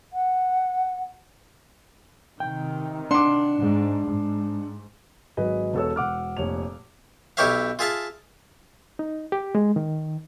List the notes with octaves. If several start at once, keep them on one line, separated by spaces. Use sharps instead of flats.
F#5
C3 D#3 G5
D4 F#5 C6 D6
G#2
G#2
G#1 F#3 G#4 B4 D#5
E1 B3 A4 C#5 E6
E1 F#5 D6 F6
F1 A#2 C#5 F7
B1 E4 G4 C#5 E5 F5
F4 G#4 E5 F5 A5
D#4
G4
G#3
D#3